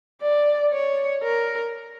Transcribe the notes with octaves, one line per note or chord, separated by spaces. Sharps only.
D5
C#5
A#4